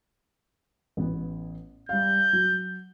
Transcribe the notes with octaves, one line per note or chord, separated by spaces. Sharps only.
A1 B3
G3 F5 G6
F#3